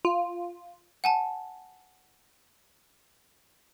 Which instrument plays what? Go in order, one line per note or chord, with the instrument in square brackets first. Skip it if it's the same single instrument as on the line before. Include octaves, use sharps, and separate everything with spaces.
[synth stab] F4
[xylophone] F#5 G#5 A5